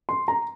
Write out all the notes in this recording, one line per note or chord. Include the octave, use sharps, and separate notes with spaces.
C6
A#5